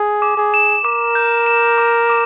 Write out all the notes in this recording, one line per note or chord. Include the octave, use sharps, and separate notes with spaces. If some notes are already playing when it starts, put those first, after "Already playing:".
Already playing: G#4
D6
G#4
E7
A#4 D6
G6
E7
D6
D6